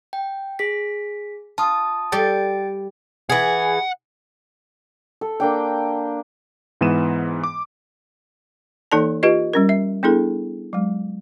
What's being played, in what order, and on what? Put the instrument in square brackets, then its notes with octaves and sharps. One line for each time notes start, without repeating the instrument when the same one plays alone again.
[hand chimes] G5
G#4 B6
[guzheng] F4 [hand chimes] A5 D#6
[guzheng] G3 G4 A4 [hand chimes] G5 A6 D7
[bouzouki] E3 G#4 [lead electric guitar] F#5
[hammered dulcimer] A4
A#3 D4 G5
[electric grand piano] G#2 E3 B3 D#7 E7
D6
[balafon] E3 A#3 D#4 A4 D5 A5
F4 G4 B4 D#5
G3 C#4 A#4
E5
B3 D4 E4 G#4 A4
F#3 G#3